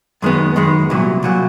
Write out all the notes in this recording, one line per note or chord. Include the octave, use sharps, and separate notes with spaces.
F#2 D#3 G#3 B3
F#2 D#3 G#3 B3
C2 A#2 F#3
C2 A#2 F#3